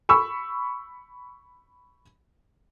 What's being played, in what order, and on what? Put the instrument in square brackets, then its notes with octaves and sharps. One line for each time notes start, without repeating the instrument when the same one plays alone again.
[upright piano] B5 C#6 E6